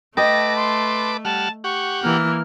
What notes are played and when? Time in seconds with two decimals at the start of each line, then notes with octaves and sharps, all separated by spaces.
0.17 A3 B4 D#5 G5 A5 D6 A#6
0.56 C6
1.25 G3 F#5 A5 F6
1.64 G4 F#5 C#6
2.03 E3 A#3 F6